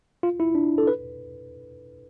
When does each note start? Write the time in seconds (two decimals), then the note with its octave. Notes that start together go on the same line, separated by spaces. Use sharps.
0.23 F4
0.40 E4
0.55 D4
0.78 A4
0.87 B4